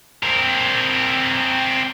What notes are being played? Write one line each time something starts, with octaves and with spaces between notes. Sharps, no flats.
C4 A#4